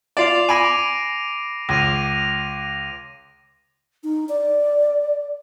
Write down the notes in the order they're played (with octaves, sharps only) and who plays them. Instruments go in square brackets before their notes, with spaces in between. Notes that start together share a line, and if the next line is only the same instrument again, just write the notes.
[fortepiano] F4 D5 [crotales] D6 C7 F7
[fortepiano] G#5 B5 D6 [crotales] A#6 D7 D#7
[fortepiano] C#2 [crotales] A#6 D#7 F7
[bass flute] D#4
D5